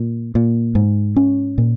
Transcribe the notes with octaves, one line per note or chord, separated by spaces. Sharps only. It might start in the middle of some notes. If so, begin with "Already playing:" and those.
Already playing: A#2
A#2
G#2
C#4
A#2